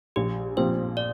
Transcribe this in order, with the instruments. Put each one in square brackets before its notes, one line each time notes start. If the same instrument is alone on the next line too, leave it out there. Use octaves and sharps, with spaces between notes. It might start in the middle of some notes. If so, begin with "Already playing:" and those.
[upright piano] A#1 [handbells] G4
[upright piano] A#2 F3 C4 G4 [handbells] C5
[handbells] D5